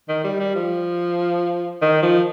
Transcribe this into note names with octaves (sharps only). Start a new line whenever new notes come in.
D#3
G3
G3
F3
D#3
F3